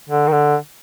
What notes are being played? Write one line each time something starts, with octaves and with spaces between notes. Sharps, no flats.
D3
D#3
D3